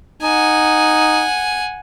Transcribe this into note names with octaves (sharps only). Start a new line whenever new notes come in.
D#4 F#5 G#5